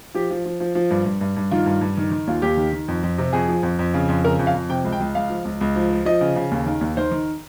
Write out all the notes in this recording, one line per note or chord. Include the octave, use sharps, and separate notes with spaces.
F3 G4
F3
F3
F3
F3
G2
G2
G2
G2
D#3 F4
G2
G2
D#3
D#3
D#2 F4
D#2 G4
D#3
D#3
F2
F2
C3
F2 G#4
F3
F2
F2
C#3
F2
C#3 A#4
F2
F5
F2
C3 G5
C#2
G5
C#2
C#2 F5
F3
C#2
C#2
F3
F3
F3 D#5
C#3
C#3
D#2
D#3
D#2
D#3 C5
D#3